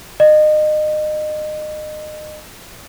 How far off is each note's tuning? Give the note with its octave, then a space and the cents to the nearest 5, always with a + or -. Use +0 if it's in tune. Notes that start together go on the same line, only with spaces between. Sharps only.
D#5 -30